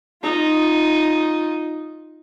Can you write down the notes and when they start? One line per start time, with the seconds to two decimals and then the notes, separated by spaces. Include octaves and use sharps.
0.23 D#4 F4